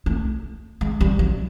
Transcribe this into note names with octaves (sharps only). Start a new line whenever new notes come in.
A3
G#3
G3
F#3